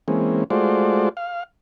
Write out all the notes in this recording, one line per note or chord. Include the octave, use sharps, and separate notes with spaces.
E3 G#3 A#3 C4 C#4
G#3 A3 F4 F#4 C5 D5
F5